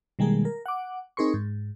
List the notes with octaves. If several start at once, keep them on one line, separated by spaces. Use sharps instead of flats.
B2 D#3 G3 G#3 A#3 G#4
A#4
F#5 D6
C4 D#4 G#4 A#4 C6 C#6
G#2